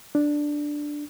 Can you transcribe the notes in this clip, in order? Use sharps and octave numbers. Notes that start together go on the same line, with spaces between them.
D4